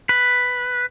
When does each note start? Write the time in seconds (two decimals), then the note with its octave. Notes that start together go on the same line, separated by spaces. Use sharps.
0.09 B4